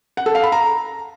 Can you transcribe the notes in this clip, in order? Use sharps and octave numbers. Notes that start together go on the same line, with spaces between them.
F#5
A4
F5
B5
A#5